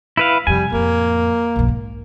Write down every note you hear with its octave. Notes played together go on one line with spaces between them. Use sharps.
E4 B4 F5
F2 C3 G3 G#5
F2 A2 A#3
B1 F#2
G#2